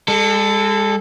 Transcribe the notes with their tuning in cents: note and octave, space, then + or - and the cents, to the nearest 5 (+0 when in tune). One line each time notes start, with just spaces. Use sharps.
G#3 -40 A4 +0